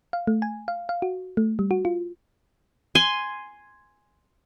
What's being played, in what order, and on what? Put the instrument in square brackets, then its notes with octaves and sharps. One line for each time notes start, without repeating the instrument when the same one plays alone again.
[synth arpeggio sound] F5
A3
G#5
F5
F5
F#4
A3
G3
F#4
F4
[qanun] G#5 C6